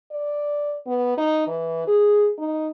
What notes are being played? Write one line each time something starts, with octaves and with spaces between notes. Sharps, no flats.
D5
B3
D#4
E3
G#4
D#4